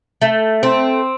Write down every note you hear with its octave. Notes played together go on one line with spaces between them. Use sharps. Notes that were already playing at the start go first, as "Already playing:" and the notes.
A3
C4